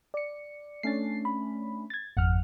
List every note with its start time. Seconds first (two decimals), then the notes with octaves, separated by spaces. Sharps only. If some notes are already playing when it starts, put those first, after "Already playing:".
0.14 D5 C#7
0.83 A3 C#4 D4 A6 C7
1.25 B5
1.90 G#6 A6
2.17 G#1 F2 F#5 F6